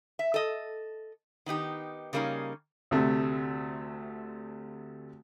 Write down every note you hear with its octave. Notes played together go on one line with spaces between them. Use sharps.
E5
A4 D#5
D#3 B3 D#4 G4
C#3 G3 A#3 C#4 D#4
D2 C3 A3